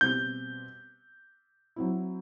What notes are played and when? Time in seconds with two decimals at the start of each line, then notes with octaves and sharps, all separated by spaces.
0.01 B2 G3 C4 G6
1.76 F#3 C4 E4